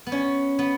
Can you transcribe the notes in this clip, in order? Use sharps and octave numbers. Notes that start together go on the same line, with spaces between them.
B3
C#4
B3